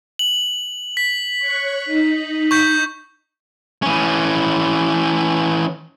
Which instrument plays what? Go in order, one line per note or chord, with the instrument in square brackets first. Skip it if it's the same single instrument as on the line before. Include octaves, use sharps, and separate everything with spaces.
[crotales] F#7
B6
[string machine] C#5 C#6 F#6
D#4
[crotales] C#6 G6 B6
[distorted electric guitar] E3 C#4